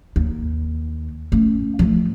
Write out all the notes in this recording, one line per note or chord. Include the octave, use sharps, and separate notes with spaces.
D#2
A3 C#4
F3 A3